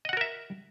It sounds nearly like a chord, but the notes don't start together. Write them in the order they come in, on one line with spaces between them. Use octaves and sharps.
D#5 F#5 F#4 A#4 E5